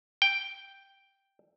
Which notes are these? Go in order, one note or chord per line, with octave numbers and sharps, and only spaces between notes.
G5